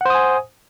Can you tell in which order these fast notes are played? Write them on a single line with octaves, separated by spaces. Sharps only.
F#5 C5 D#6 G#5